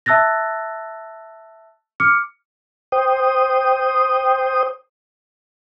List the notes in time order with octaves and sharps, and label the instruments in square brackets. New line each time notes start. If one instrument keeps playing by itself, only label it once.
[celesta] E5 A5 E6 F#6 A6 A#6
D6 F6 C#7
[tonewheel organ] C5 G5 D#6